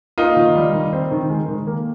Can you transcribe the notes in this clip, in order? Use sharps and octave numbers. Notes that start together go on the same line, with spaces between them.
A#3 D#4 F4
D#3
G3
D#3
C4
D#3
G#3
D#3
A#3